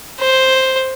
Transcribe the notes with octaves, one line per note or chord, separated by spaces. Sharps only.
C5